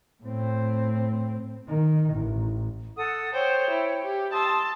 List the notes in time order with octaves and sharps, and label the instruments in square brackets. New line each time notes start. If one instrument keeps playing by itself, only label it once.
[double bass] A2 C4
D#3
A1
[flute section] A4 F#5 D#6
[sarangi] C5 [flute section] C#5 G5
[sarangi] E4
G4
[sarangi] A5 [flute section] C6 D#6 E6